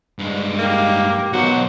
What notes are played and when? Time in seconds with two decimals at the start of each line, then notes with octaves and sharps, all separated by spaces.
0.19 G2 G#3
0.59 A#3 G4
1.33 B1 B2 F#3 F#4 C5